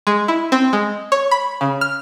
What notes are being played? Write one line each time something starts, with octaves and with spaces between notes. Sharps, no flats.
G#3
E4
C4
G#3
C#5
B5
C#3
F6